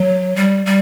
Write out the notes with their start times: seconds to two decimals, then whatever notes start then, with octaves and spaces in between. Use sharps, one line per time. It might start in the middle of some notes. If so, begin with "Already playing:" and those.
Already playing: F#3
0.36 G3
0.66 G3